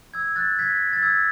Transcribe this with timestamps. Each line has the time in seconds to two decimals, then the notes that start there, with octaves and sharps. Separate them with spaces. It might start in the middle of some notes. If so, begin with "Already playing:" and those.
0.14 E6 G#6
0.36 F#6 A6
0.59 G#6 B6
0.93 A6
1.02 E6 G#6